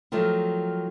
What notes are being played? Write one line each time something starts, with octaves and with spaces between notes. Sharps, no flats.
D#3 F3 F#3 A3